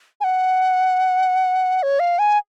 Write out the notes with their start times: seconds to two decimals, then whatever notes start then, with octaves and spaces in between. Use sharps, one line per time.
0.21 G#5
0.24 F#5
1.83 C#5
2.00 F5
2.19 G#5